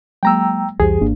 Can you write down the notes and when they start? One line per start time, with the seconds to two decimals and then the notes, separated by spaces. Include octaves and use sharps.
0.23 F#3 G#3 A#3 G5 A#5 E6
0.80 C2 F2 E3 G3 G4 G#4 C5
1.01 G#1 G#2 A#3 D4